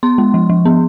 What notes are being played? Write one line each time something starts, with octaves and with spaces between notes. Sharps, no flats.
B3 C6
G#3
F3
F3
B3